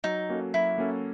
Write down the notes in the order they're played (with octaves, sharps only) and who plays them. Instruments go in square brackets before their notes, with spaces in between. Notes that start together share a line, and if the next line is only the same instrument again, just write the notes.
[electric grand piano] F#3 [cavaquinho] D#4
[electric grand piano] A#3 C#4 F#4 A4
[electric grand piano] F#3 [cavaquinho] E4
[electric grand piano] A#3 C#4 F#4 A4